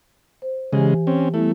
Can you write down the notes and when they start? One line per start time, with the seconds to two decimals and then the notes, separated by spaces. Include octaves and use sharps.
0.42 C5
0.73 C#3 E3 G#3 G4 G#5
1.07 C4 C#4
1.34 G3 A3 B3 E4